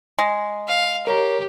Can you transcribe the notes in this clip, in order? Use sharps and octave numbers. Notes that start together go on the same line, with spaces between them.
G#3
F5
G4 A#4 C#5 A#5